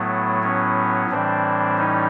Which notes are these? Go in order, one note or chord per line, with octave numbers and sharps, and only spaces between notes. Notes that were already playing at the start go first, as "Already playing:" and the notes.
Already playing: A2 F#3 A3 B3
B3 C#4
A2 E3 G3 C4 D4
C#4 D#4